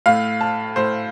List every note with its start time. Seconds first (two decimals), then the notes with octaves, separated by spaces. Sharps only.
0.06 A2 A3 F5
0.41 A5
0.76 A2 A3 C5